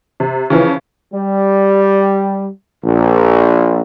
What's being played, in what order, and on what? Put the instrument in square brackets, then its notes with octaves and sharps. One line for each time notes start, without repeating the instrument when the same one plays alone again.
[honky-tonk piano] C3
C#3 E3 F3
[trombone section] G3
A#1